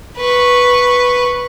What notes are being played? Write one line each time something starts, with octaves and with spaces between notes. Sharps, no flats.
B4 C#6